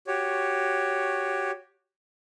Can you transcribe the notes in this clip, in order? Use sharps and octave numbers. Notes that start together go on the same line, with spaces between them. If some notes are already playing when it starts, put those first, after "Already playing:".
F#4 G4 C#5